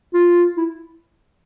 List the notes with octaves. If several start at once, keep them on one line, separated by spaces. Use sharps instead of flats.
F4
E4